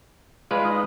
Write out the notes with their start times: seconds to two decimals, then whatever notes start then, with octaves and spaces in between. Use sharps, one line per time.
0.51 G#3 F4 B4 D5
0.64 D#4